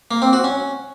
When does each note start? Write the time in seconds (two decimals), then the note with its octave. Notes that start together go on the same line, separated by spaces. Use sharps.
0.11 A#3
0.22 C4
0.33 F#4
0.44 C#4